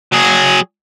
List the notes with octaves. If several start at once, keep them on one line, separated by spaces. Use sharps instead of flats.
F#3 G#4